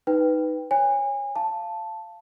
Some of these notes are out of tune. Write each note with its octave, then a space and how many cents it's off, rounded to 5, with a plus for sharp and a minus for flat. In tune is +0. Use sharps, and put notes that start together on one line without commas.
D#4 +5 B4 +5 G5 +5
C#5 -5 G#5 -30
F5 -15 A5 +0